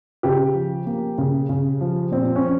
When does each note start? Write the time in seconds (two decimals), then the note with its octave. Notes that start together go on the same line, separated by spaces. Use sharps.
0.23 C#3 G4
0.54 F3
0.86 A#3
1.18 C#3
1.49 C#3
1.81 F3
2.12 A#2 C4
2.36 C#4
2.44 F3